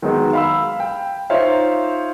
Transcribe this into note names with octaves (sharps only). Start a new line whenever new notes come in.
D#3 F#3 G#3 B3 D#4
F5 B5 E6
G5
D#4 F4 C5 C#5 E5 F5